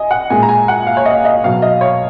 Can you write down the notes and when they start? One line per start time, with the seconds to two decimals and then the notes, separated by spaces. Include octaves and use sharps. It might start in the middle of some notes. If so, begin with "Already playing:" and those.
Already playing: D#5 G#5
0.11 F#5
0.30 A#2 G#3 G#5
0.43 A#5
0.49 G#5
0.68 F#5
0.87 F5
0.97 C#5
1.05 D#5
1.25 D#5
1.44 B2 F#3 F5
1.62 D#5
1.81 C#5